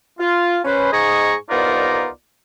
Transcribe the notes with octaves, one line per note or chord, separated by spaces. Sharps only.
F4
C#4 B4 C5
G#2 G#3 G#4 D#5 A#5 C#6
C2 B3 D#4 F4 A#4 D5